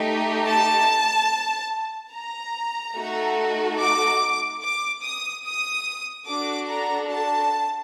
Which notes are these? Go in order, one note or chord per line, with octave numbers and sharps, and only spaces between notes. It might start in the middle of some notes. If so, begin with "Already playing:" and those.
Already playing: A3 D#4 G4
A5
A#5
A3 D#4 F#4 A4
D6
D6
D#6
D#6
D4 F#4 A4 D6
A#5
A5